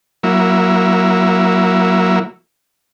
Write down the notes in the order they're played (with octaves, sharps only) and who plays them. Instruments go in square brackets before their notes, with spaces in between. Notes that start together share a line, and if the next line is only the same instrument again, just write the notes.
[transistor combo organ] F#3 A#3 E4